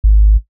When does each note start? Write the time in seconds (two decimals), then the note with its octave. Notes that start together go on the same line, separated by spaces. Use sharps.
0.04 G#1